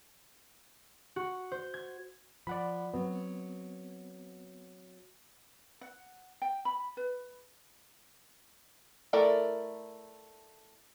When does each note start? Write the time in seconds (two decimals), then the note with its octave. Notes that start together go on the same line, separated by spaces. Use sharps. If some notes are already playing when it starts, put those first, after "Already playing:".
1.16 F#4
1.52 C5
1.74 G#6
2.47 F3 D5 F#5 B5
2.94 F#3 B3 C4
5.81 F#5
6.42 G5
6.65 B5
6.97 B4
9.13 A3 E4 A#4 D5